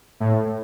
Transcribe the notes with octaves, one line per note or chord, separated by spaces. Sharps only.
A2